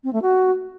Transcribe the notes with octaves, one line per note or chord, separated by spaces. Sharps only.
C4
A3
F#4